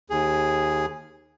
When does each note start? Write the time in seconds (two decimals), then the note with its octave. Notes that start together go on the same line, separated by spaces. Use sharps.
0.10 D#2 G#4